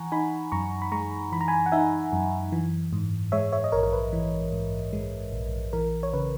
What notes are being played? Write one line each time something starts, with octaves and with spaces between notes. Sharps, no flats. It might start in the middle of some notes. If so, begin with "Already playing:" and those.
Already playing: E3 F#5 G#5 A#5 C#6
D#4 G#5 B5
F#2 A#5 C#6
B5
G#3 A#5 C#6
E3 B5
A#5
G#5 B5
F#5
D#4 E5 G#5
F#2
E3
G#2
G#3 C#5 E5
C#5 E5
D#5
A#1 A#4 C#5
A#4
B4
E3
G#2
G#3
A#1
E3 A#4
C#5
C#3 B4